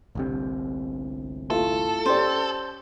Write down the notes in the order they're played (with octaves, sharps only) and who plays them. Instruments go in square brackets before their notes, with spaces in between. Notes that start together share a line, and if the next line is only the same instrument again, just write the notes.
[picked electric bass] G1 C2 C3
[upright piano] A3 E4 F4 [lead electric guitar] A4
[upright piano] C#4 G4 D5 [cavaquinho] C5